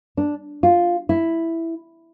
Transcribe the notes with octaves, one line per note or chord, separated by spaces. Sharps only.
D4
F4
E4